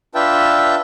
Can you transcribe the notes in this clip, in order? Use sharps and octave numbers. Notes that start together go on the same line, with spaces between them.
D4 F4 B4 E5 G5 A5